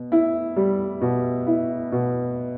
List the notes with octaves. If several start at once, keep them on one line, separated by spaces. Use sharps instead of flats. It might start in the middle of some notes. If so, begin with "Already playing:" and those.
Already playing: B2
E4
G3
B2
E4
B2